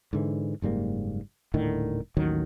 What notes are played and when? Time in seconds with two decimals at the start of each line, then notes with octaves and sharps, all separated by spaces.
0.13 G#2 D3 E3
0.62 F#1 G#2 G3 A#3
1.54 D#1 A2 D3 D#3
2.17 A1 D#2 D#3 F#3